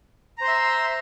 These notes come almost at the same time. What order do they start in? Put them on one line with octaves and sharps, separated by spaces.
A#5 C5 C6 E5